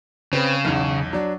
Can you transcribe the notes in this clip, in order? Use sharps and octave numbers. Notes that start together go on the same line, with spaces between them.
C#3 C4 B4
B1 E2
F#3 D4